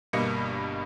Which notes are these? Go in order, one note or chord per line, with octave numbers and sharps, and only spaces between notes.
G1 G2 B2 A#3 D#5 C#7